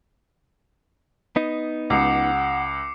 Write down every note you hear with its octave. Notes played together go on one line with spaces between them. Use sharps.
B3 D#4
C#2 F#5 D6 C7 C#7